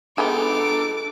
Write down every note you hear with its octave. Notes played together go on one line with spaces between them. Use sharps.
G#3 B3 D4 G4 A4 A#5 D6